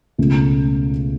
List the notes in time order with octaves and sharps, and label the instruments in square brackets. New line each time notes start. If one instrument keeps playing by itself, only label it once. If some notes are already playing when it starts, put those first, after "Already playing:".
[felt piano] C#2 B2 A3 C#4